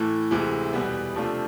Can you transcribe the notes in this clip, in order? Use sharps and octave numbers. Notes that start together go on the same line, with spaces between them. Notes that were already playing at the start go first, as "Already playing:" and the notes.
Already playing: A2 E3 A3
D2 C3 E3 G#3
E2 B2 G3 B3
C3 F3 A3 D4 F4